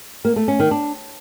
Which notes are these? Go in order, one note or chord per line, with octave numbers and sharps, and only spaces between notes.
A#3
A3
C#4
D#3
D4